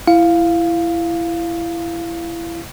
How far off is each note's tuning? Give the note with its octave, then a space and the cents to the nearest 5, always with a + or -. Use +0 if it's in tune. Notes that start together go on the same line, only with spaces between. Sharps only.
E4 +20 F5 +0